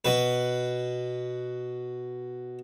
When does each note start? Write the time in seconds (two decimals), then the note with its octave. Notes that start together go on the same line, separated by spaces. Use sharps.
0.05 B2 B4